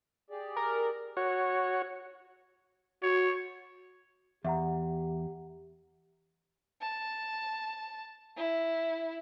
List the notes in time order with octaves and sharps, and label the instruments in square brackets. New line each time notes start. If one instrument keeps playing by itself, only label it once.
[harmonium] G4 G#4 D5
[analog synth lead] A#4
[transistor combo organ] F#4 C#5
[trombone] F#4 [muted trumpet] C#5
[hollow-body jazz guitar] E2 [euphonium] G4 [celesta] E5 F#5 A#5
[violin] A5
E4